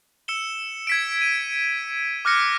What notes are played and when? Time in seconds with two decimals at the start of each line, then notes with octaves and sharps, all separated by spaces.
0.28 E6 C#7 E7 G7
0.87 G#6 B6 D7
1.21 D#7
2.25 D6 F6 F#6 A#6 C#7